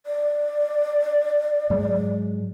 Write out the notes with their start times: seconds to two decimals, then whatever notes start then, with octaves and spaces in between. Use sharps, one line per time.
0.06 D5
1.70 G#2 F#3 G#3